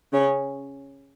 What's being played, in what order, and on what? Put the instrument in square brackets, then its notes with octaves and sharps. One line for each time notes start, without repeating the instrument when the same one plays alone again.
[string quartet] C#3 C#4